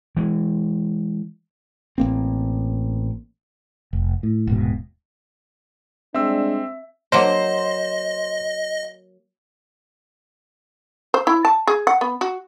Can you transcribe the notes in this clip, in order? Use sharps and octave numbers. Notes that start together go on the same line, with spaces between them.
E3 G#3
A1 A#3 C4
F1
A2
D#1 G#2 B2
G3 G#3 C4 D4 E5 E6
F#3 A#3 A#4 C5 D#5
C5
E4
A5
G#4
F#5
B3
F#4